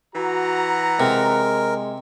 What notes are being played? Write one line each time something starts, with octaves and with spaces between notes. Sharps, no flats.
E3 F#4 F#5 A#5
C3 G#3 A#4